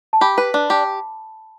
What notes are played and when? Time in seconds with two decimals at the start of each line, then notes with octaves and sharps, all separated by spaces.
0.13 A5
0.21 G4 B5
0.38 B4
0.54 D4
0.70 G4 A5